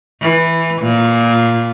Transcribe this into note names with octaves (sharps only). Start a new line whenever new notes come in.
E3
A#2